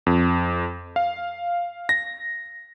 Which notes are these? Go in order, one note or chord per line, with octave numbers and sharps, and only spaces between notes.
F2
F5
A#6